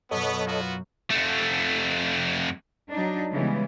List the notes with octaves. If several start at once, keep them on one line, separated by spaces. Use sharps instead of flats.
F#2 B2 B3 A4 C#5 D#5
B3 F4 F#4
F2 A3
F#3 D4 D#4
C#3 E3 G3 G#3 B3